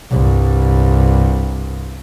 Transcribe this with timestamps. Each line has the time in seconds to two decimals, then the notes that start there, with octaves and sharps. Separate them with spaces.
0.11 C2 G2